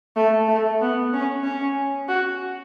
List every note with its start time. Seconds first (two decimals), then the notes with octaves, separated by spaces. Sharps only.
0.16 A3
0.48 A3
0.81 B3
1.13 C#4
1.44 C#4
2.09 F#4